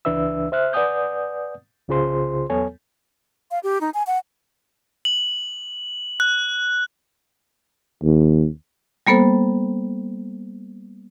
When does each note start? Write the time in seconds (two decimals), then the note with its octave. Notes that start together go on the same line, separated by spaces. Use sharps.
0.05 C#2 E3 D4 B4 E5 E6
0.52 C5 E5 F6 F#6
0.73 B4 D5 F#5 G#5 D#6 G6
1.88 C2 C#3 F4 G#4 C5 C6
2.50 E2 F#3 B3 A4 C#5 G#5
3.51 F5
3.63 G4
3.81 D#4
3.94 G#5
4.07 F#5
5.05 F#7
6.20 F#6
8.04 D#2
9.07 G3 A#3 B3 A4 C5